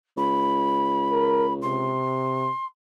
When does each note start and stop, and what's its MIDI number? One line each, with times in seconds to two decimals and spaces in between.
0.17 1.98 37
0.17 1.53 83
1.12 1.46 70
1.61 2.48 48
1.61 2.64 84